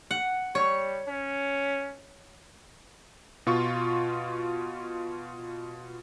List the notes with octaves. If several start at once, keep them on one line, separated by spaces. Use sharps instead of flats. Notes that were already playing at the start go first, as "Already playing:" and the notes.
F#5
G3 C#5
C#4
B2 F4 C#6